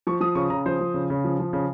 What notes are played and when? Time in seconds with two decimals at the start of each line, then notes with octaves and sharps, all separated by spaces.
0.07 F3 C#6
0.21 F3 D#6
0.35 C#3 C#6
0.50 C#3 A#5
0.66 F3 C5
0.81 F3
0.94 C#3
1.10 C#3
1.25 F3
1.39 F3
1.53 C#3